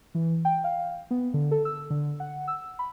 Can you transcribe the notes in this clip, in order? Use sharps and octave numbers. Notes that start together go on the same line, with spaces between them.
E3
G5
F5
B3
D3
A4
E6
D3
F#5
E6
B5